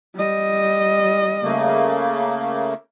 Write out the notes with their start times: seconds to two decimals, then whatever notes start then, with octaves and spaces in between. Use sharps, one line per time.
0.15 G3 D#5
1.42 C#3 A3 A#3